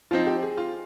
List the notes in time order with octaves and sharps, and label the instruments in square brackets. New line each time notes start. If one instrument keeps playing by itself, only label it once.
[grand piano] F3 C4 D#4 [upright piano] F4
[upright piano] G4
G#4
F4